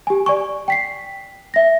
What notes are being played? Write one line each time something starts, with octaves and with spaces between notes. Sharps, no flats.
G4 G#5
D5 G#5 C#6
G5 B6 C7
E5 A#6